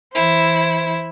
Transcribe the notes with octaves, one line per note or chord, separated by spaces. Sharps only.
E3 E4 C5